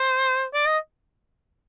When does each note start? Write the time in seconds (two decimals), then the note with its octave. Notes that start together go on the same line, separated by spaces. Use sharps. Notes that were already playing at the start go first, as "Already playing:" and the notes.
Already playing: C5
0.54 D5
0.66 D#5